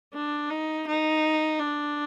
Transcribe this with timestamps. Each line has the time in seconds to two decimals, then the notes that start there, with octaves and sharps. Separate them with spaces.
0.14 D4
0.50 D#4
0.87 D#4
1.59 D4